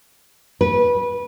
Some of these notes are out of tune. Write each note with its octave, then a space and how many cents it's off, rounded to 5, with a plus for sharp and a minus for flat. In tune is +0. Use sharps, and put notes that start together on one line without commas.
B4 -20